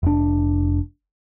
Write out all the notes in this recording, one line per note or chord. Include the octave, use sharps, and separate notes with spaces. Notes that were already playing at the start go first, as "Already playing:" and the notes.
F1 D4